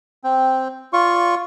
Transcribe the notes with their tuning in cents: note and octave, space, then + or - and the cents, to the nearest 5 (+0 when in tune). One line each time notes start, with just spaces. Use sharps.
C4 +0 G5 +0
F4 +0 D5 -20 C#6 -10